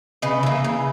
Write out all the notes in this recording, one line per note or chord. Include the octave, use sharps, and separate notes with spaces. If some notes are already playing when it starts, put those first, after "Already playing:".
C#3 B4 D#5
E3 A#3
C#3